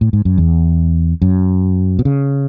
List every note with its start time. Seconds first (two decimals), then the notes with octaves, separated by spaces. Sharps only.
0.01 A2
0.13 G#2
0.25 F#2
0.38 E2
1.22 F#2
1.99 B2
2.05 C#3